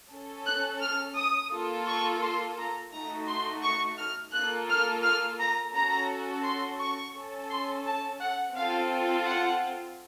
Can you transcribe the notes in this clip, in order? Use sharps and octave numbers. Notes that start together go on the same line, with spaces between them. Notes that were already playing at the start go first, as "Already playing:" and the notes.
C#4 A4
F#6
F6
D#6
A#3 F4 A4
C#6
C6
A#5
A3 D#4 F#4 A#5
C6
C#6
F6
A#3 F4 A4 F#6
F6
F6
A#5
C#4 F#4 A4 A#5
C6
C#6
C#4 A4
C6
A5
F#5
C4 F4 A4 F5
F#5